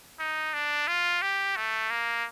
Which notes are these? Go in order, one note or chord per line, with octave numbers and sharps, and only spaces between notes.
D#4
D4
F4
G4
A3
A#3